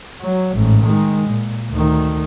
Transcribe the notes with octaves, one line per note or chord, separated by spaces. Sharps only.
F#3
A1 G#2
D#3 G#3
A#2
D2 D#3